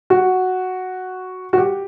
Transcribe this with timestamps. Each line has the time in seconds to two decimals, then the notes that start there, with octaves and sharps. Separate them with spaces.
0.10 F#4
1.53 F#4
1.58 G4